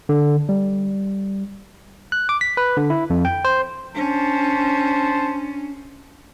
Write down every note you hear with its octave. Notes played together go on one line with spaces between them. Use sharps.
D3
G3
F#6
D6
B6
B4
D3
E4
F2
G5
C5
C#4 D4 C5 A5